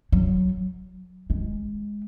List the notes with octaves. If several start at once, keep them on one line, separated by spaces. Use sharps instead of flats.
F#3
G#3